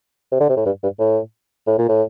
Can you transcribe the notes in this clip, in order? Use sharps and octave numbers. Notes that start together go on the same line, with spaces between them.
C3
D3
C3
A2
G2
G2
A2
A2
A#2
A2